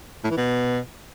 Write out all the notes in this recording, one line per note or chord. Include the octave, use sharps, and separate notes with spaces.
A2
E3
B2